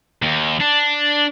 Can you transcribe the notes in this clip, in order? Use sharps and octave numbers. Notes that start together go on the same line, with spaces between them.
D#2
D4